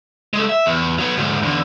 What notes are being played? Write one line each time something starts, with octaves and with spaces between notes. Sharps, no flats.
G#3 A4
E5
E2
F#3 B3
D2 G#2
E2 D3